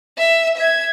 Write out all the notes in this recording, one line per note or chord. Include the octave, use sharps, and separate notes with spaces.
E5
E5 G#6